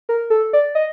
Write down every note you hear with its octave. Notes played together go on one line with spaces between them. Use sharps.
A#4
A4
D5
D#5